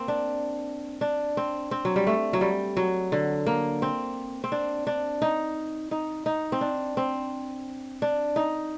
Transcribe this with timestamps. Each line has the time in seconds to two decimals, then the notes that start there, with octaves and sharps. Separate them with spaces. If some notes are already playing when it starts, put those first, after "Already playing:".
Already playing: A#3 C4
0.08 D4
1.01 D4
1.37 C4
1.71 C4
1.85 F#3
1.96 G3
2.07 A3
2.33 F#3
2.41 G3
2.77 F#3
3.12 D3
3.47 A#3
3.82 C4
4.44 C4
4.52 D4
4.87 D4
5.22 D#4
5.91 D#4
6.26 D#4
6.52 C4
6.61 D4
6.97 C4
8.02 D4
8.36 D#4